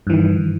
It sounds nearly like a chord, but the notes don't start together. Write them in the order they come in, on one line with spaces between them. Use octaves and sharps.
G2 E3 D#3